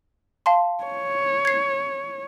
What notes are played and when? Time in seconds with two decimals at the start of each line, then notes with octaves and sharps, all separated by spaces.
0.46 F5 A5 C6
0.84 C#5
1.45 G#6 C7